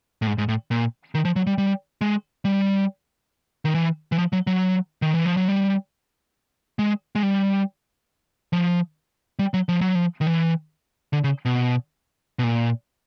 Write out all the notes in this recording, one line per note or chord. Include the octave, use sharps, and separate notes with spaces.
A2
G#2
G#2
A2
A#2
D#3
F3
F#3
G3
G3
G#3
G3
D#3
E3
E3
F3
F#3
F#3
D#3
E3
F3
F#3
G3
G#3
G#3
G3
F3
G3
F#3
F3
F#3
F3
D#3
E3
D3
C#3
B2
B2
A#2